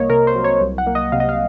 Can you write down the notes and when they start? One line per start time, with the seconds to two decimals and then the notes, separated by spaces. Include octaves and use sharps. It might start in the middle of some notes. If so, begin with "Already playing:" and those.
Already playing: C2 A#3 C#5 D#5
0.10 C3 A#4
0.27 C5
0.35 F#3
0.44 C#5
0.61 C2
0.78 F#5
0.87 A#3
0.95 D#5
1.12 C3 F5
1.20 D#5
1.29 F5